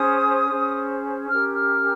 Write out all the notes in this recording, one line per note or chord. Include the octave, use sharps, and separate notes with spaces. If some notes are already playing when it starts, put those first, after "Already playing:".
Already playing: C#4 G#4 C5 D#6
C#4 G#4 C5
C#4 G4 A#4 F6
F6